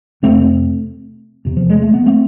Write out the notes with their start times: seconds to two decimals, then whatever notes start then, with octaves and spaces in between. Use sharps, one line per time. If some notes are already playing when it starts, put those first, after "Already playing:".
0.23 F2 C3 A3 C4
1.45 E2 C3
1.57 F3
1.69 G#3
1.82 A3
1.94 B3
2.06 A3 C4